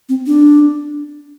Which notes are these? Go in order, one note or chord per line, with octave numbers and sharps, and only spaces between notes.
C4
D4